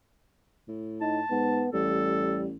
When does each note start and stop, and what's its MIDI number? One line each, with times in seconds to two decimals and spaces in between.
0.68 1.21 45
1.01 1.21 63
1.01 1.66 81
1.31 1.64 44
1.31 1.71 59
1.73 2.56 33
1.73 2.48 55
1.73 2.42 69